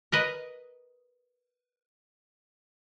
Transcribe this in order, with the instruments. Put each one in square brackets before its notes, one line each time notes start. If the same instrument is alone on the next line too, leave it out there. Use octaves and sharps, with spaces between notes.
[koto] A#4 B4 D#5